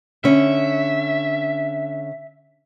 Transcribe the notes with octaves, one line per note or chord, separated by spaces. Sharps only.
D3 C#4 E5